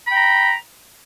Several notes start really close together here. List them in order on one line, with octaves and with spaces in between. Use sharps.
B5 G5 A#5